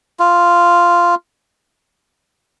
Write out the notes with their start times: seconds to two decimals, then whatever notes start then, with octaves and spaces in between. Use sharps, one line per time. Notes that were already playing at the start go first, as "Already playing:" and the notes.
0.20 F4